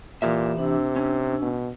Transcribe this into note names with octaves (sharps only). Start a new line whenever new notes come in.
A#2 E3 G4 E5
C3 D4 E6
C#4
B2